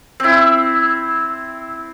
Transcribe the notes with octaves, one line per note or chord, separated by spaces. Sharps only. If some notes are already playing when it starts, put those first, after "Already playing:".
C4 E4